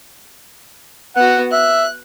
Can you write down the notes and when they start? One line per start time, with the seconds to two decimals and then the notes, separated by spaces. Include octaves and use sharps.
1.16 B3 F#4 F#5
1.52 E5 F#6